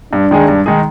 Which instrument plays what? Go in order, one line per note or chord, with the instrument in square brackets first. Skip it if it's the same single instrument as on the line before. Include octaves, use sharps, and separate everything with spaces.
[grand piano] G2 [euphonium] D4
[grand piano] D#3 G#3 D#4 G#4
G2
D#3 G#3 D#4 G#4